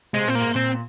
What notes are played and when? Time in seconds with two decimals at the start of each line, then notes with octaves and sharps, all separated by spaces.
0.14 C3 G#3
0.27 A#2 C4
0.35 A#3
0.40 G#2
0.54 A#2 C4